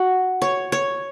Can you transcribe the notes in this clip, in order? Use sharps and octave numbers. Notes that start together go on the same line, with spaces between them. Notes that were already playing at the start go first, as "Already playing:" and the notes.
Already playing: F#4
C#5
C#5